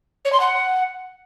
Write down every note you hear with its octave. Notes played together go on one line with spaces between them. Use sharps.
C#5
C6
F#5